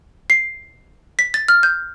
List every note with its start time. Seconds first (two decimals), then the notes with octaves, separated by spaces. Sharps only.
0.30 C7
1.19 B6
1.34 A6
1.48 F6
1.63 G6